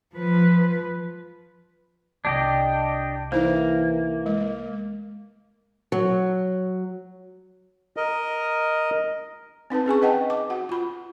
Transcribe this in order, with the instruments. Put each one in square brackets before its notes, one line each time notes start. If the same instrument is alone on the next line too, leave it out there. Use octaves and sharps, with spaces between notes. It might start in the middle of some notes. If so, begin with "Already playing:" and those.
[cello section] F3 B4
[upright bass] C2 [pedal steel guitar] D4 G4 D#5
[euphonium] E3 [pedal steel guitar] A#3 [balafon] D#4 E4 C5
[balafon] G#3
[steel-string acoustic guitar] F#3
[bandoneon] A#4 D#5
[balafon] C4 D#4 B4 A5
C#4 G#4 G#5 C#6
B4 D#5 F#5 G5 A5
D6
F#4 F#5
F4 B5